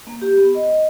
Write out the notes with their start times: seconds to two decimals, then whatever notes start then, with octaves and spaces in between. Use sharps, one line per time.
0.07 A#3
0.22 G4
0.37 B3
0.55 D#5